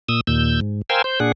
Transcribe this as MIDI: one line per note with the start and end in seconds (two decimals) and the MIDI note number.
0.09 0.21 46
0.09 0.21 87
0.09 0.21 88
0.27 0.60 39
0.27 0.60 46
0.27 0.60 88
0.27 0.60 91
0.61 0.82 44
0.90 1.02 70
0.90 1.02 72
0.90 1.02 77
0.90 1.02 79
0.90 1.02 80
0.90 1.02 88
1.04 1.20 72
1.04 1.20 91
1.20 1.32 46
1.20 1.32 62
1.20 1.32 68
1.20 1.32 78